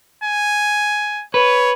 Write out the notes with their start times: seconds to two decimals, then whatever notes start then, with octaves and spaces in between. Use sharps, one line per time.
0.24 G#5
1.34 B4 C#5